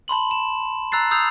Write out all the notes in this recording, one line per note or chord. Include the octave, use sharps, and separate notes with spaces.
A5 B5 C6 F#7
E7
A#5 E6 F#6 A6 C7
D#6 E6 G6 C7 F7